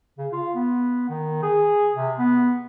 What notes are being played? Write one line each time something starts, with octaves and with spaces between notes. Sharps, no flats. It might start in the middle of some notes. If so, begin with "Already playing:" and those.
C#3
F4
B3
D#3
G#4
C3
B3